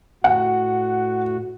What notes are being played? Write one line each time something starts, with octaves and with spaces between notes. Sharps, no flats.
A2 F#4 F#5